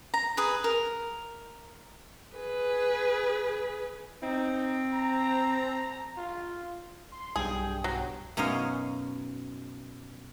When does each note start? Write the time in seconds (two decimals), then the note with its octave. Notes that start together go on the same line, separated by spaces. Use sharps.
0.14 A#5
0.37 G#4 B4
0.64 A#4
2.37 G#4 B4
4.23 C4 D#4
4.94 A#5
6.17 F4
7.12 C6
7.36 B1 G2 G#4 G5
7.84 F#3
8.37 F#2 B2 D#4 C#5 D#5 F5